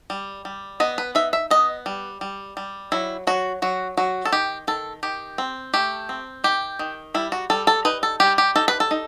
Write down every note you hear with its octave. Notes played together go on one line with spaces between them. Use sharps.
G3
G3
B3 D#5
B4
D#4 E5
E5
B3 D#5
G3
G3
G3
F#3 E4
F#3 F#4
F#3 F#4
F#3 F#4
A4
D#3 G4
D#3 A4
D#3 G4
C4
A3 G4
C4
D#3 G4
D#3
G3 E4
F#4
G3 A4
A4
D#4 B4
A4
G3 G4
G4
D#4 A4
B4
A4
D#4